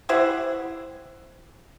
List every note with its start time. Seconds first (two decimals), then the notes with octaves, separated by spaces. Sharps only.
0.09 E4 G4 C5 F#5